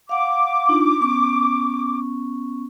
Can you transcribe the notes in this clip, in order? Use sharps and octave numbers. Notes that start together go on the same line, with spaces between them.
F5 F#5 D6
D4 D#4 F4
B3 C#4 C#6